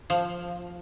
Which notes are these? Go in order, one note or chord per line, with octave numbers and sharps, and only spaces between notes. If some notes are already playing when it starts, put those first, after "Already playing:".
F3